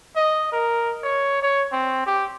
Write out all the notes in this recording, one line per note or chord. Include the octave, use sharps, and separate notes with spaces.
D#5
A#4
C#5
C#5
C4
G4